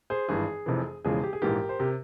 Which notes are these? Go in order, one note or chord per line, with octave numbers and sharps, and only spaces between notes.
G#4 C5
G#1 G2 E3 G#4
F1 F2 C3 E3
E1 E2 C#3 F3 G#3 G#4
G4
G#4
A#1 G#2 E3 G4 A#4
C5
C3 G4 A#4